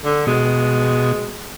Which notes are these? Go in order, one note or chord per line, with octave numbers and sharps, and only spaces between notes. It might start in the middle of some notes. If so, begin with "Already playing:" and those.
D3
B2 G#3